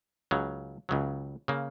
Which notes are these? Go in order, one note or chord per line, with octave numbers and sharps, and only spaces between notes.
C#2 C#3 F#3
C#2 C#3 F#3
C#3 A#3